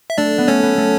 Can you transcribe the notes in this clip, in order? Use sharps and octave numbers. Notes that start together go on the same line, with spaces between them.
E5
A3 D4 D5
B3
A3 C#4 C#5
B3
A3